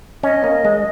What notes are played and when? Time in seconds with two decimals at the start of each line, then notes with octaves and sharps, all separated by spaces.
0.23 C#4 D#5
0.44 A#3
0.65 G#3